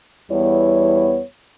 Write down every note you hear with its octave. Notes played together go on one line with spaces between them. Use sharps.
E2 G3 B3 E4 C#5